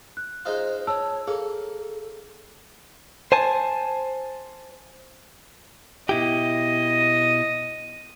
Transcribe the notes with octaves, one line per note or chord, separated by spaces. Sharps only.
F#6
G#3 D#4 F4 C5
C#5 A5 E6
A#3 G#4 A4
C5 G#5 A5
B2 E4 G4 D#5